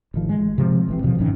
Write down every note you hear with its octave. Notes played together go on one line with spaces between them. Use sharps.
A1 D#3 F3
G#3
C3 F3 G#3
A1 E3 C4
D2 B2 D3 F3
G#1 F#2 D#3 C#4